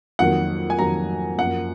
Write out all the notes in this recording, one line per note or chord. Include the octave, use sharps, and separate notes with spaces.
F2 D#3 F#3 A#3 F#5
G#5
F2 D#3 F#3 A#3 A#5
F#2 F3 A#3 F#5